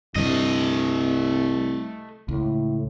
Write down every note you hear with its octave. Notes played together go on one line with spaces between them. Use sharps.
C2 G2 D3 A3 D#5
C#2 A2